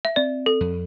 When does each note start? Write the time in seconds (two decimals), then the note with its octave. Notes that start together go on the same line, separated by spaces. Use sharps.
0.05 E5
0.16 C4 D5
0.46 A4
0.60 F2